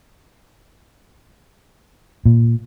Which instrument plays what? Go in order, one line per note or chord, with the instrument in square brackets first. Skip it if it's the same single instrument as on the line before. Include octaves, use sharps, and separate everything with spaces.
[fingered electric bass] A#2